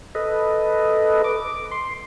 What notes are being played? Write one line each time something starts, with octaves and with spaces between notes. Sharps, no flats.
A4 B4 D#5
D6
C6